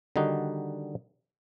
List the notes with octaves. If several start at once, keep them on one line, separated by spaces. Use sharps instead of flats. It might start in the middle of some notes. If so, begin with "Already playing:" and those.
D3 D#3 G3 D#4 F#4